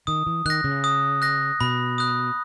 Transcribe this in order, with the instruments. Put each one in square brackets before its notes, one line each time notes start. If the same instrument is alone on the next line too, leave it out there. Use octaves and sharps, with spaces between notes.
[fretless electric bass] D#3 [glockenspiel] D#6
[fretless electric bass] E3
[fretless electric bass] D#3 [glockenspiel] F#6 A#6
[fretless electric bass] C#3
[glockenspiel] D#6
F#6 A#6
[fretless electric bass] B2 [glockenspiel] B5
[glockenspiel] D#6 F#6